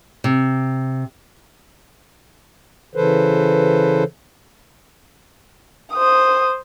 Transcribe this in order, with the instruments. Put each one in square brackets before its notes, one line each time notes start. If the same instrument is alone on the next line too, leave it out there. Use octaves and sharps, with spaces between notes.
[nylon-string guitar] C3
[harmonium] C#3 E3 A4 B4 C5
[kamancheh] C5 D#6